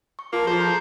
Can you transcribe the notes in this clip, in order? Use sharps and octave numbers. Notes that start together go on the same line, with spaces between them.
C#6
A#3 F4 A5 C6
F3 G#4 A4 C5 G6
A#5 C6 F#6